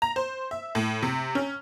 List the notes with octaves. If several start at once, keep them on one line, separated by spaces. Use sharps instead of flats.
A#5
C5
E5
A2
C3
C#4